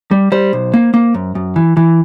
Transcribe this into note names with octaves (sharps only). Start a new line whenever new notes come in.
G3
G3 C5
B1
A#3
A#3
F#2
F#2
E3
E3